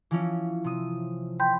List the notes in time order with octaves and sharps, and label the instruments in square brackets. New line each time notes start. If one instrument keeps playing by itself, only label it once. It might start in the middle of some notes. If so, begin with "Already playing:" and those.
[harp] E3 F3 C#4
C3 D#6
[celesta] G5 C6 G6 [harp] B5